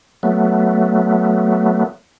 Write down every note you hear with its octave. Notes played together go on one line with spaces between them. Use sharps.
F#3 A3 B3